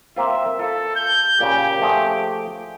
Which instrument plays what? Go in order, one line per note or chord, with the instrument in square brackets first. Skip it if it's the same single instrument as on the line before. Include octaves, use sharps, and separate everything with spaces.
[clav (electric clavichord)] A#3 C4 F4 [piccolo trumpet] E5
[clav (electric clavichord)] F4 [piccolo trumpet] A4
[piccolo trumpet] G6
[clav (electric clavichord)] A#2 C#3 [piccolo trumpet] G4
[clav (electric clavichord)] F3 A3 G#4